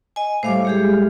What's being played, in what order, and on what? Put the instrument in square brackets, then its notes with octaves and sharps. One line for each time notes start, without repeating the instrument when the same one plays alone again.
[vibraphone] D#5 G#5
[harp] A2 G3 [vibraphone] C5 F5 D6
[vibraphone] G#3 G4 G#4
[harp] F6